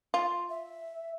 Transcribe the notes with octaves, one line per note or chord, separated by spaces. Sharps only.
F4
E5